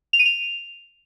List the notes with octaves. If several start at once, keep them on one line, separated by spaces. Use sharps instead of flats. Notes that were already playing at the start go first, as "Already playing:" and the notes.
F7
D#7
F7